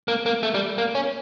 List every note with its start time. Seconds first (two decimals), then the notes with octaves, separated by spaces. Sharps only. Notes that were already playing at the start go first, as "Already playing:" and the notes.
0.08 A#3
0.26 A#3
0.43 A3
0.54 G3
0.78 A#3
0.95 C#4